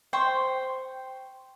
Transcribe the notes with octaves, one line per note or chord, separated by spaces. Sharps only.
C5 G5 C#6